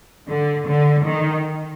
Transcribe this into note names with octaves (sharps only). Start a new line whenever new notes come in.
D3
D3
D#3